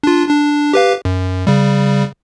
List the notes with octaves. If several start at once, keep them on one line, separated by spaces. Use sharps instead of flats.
D4 F4
D4
G4 B4 F5
F#2
C#3 G3